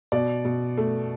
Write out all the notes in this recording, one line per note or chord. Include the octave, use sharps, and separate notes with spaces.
B2 D5
B2
A3